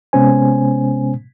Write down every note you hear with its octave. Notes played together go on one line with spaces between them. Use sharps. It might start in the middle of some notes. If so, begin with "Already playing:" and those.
C3 G#3 B3 C#4 C5 G#5